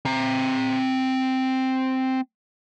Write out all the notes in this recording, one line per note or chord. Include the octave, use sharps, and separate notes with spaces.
C4 A#5